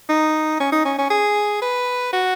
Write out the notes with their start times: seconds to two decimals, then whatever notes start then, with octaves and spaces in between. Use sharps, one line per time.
0.09 D#4
0.60 C#4
0.72 D#4
0.85 C#4
0.98 C#4
1.10 G#4
1.62 B4
2.13 F#4